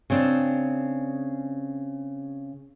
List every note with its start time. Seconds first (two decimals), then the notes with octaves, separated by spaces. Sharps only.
0.10 C#3 C4 D4